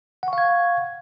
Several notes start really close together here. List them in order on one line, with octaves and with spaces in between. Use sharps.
F#5 C#6 F5 G#6